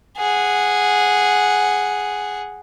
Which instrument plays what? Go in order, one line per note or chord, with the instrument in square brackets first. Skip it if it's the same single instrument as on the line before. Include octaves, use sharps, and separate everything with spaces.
[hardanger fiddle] G#4 F#5